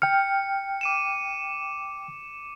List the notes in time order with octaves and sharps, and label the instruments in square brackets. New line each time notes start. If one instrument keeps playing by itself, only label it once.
[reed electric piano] G5 F6 [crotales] C#7
[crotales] D6 D#7 E7